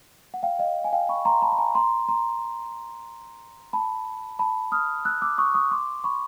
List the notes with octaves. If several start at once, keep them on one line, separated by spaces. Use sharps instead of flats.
F#5
F5 G5
D#5 F5
G#5
F5 G5
B5 C#6
A#5 C6
A5 B5
B5
G#5 A#5
A#5 C6
A#5 C6
A5 B5
A5 B5
D#6 F6
E6 F#6
D6 E6
C#6 D#6
C#6 D#6
C6 D6
B5 C#6